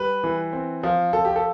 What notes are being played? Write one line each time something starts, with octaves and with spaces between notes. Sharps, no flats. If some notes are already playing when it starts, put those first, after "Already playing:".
Already playing: G3 B4
E3
C4
F3
F3 A4
G4
A4